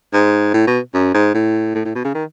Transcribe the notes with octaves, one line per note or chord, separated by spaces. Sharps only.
G#2
A2
B2
F#2
G#2
A2
A2
A2
B2
C#3
D#3